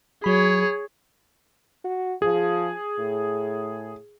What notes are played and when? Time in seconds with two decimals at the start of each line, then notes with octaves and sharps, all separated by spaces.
0.24 F#3 G#4 C#5 B5
1.84 F#4
2.22 F3 G#4
2.99 A2